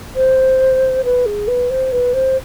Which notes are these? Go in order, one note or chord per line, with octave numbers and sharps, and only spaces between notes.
C5
B4
G#4
B4
C5
B4
C5